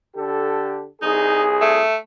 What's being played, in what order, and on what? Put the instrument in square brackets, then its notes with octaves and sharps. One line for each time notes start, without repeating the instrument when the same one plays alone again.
[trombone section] D3 G4 A4
[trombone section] C2 G#4 [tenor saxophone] D#4
[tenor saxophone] A3